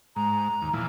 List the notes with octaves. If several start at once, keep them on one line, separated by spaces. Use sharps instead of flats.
G#2 A#5
D#2
A#2 E3 F3